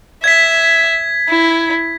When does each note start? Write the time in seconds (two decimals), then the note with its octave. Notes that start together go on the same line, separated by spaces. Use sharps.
0.24 E5 G#6 B6
1.29 E4